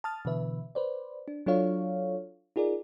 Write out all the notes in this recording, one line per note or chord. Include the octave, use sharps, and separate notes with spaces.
A5 D#6 F6 A6
B2 D3 E3 B4 E5
B4 C5 D5
D4
F#3 D4 F4 A4 C#5 F5
D#4 F4 G#4 A#4 D5